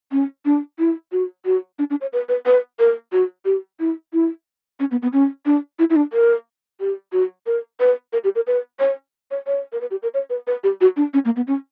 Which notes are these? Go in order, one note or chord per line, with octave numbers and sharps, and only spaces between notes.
C#4
D4
E4
F#4
F#4
D4
D4
C#5
B4
B4
B4
A#4
F#4
G4
E4
E4
C#4
B3
B3
C#4
D4
E4
E4
D4
A#4
G4
F#4
A#4
B4
A#4
G4
A#4
B4
C#5
C#5
C#5
A#4
B4
G4
A#4
C#5
B4
B4
G4
F#4
D4
C#4
A#3
B3
C#4